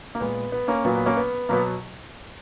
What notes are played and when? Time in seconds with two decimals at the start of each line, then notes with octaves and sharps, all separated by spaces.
0.15 A#3
0.20 A#2 G#3 B3
0.52 B3
0.68 A#3 C#4
0.85 A#2 F#3 A#3 B3
0.95 B3
1.06 A#3 C#4
1.17 B3
1.49 B2 F#3 A#3 B3